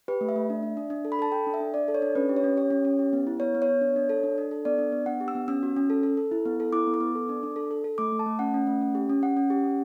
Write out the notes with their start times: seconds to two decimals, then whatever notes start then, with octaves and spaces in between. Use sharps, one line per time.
0.08 G4 B4
0.21 A3
0.29 E5
0.36 A3
0.50 D4
0.63 D4
0.77 D4
0.90 D4
1.05 A4
1.12 B5
1.19 A4 A5
1.32 A4 G5
1.47 D4
1.54 E5
1.60 D4
1.74 D4 D5
1.88 A4
1.94 C#5
2.02 D4
2.15 C#4 B4
2.29 G4
2.37 C#5
2.44 C#4
2.57 G4 C#5
2.70 C#4
2.85 C#4
2.99 G4
3.13 B3
3.27 E4
3.40 B3 C#5
3.55 B3
3.62 C#5
3.69 B3
3.81 D4
3.96 D4
4.09 A4
4.23 D4
4.38 D4
4.51 A4
4.65 B3 D5
4.78 D4
4.92 B3
5.06 D4 F#5
5.21 G4
5.28 E6
5.35 B3
5.48 C#4 E6
5.63 F#4
5.77 C#4
5.90 A4
6.03 A4
6.17 A4
6.32 E4
6.46 B3
6.60 A4
6.73 E4 D6
6.87 B3
6.94 D6
7.00 B3
7.15 A4
7.29 D4
7.43 D4
7.56 A4
7.71 A4
7.84 A4
7.98 A3 D6
8.12 A3
8.19 A5
8.26 A3
8.39 C#4 F#5
8.54 C#4
8.67 A3
8.81 C#4
8.95 G4
9.09 C#4
9.23 C#4 F#5
9.37 C#4
9.50 G4
9.64 C#4